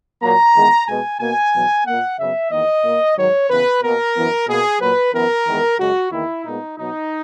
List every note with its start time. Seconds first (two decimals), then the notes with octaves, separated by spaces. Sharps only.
0.22 A#2 F#3 A#3 A#5
0.54 E2 D#3 G#3 B3
0.87 B2 G#3 B3 G#5
1.20 B2 A#3 G#5
1.53 E2 B2 F#3 B3
1.86 A#2 A#3 F#5
2.18 F#2 C#3 F#3 B3 E5
2.51 E2 D#3 A#3 D#5
2.84 A#2 A#3
3.17 G#2 D#3 F#3 C#5
3.50 C#3 E3 B3 B4
3.82 B2 A#3 A#4
4.16 F#2 E3 B3
4.48 B2 A#3 G#4
4.80 A#2 F#3 A#3 B4
5.13 F#2 E3 B3 A#4
5.47 E2 D#3 G#3 B3
5.79 F#2 C#3 G#3 F#4
6.12 E2 D#3 A#3 E4
6.44 A#2 G#3 B3 D#4
6.77 B2 F#3 B3 D#4